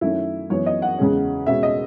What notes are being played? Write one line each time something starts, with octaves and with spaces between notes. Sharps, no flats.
F#2 D#3 A3 C#4 E4
F#2 E3 B3 C#5
D#5
F#5
E2 C#3 G#3 C#4
B2 G#3 C#4 E5
D#5